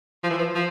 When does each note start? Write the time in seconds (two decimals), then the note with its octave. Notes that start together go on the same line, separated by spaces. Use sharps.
0.24 F3
0.30 E3
0.38 F3
0.55 F3